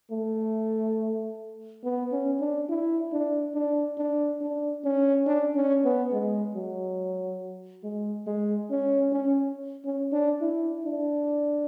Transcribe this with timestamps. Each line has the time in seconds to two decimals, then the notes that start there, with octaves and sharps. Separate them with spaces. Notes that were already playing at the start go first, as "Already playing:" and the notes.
0.11 A3
1.84 B3
2.12 C#4
2.40 D4
2.69 E4
3.12 D4
3.54 D4
3.98 D4
4.41 D4
4.84 C#4
5.27 D4
5.55 C#4
5.84 B3
6.12 G#3
6.55 F#3
7.84 G#3
8.27 G#3
8.70 C#4
9.13 C#4
9.85 C#4
10.12 D4
10.41 E4
10.85 D4